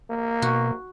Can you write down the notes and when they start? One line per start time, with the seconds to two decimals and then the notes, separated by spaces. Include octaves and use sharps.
0.10 A#3
0.42 B2 F#4